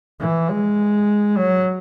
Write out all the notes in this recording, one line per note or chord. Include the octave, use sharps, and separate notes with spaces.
E3
G#3
F#3